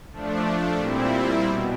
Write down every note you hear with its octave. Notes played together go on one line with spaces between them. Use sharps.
F3 A3 D4
A#2 G3 C4 E4
B2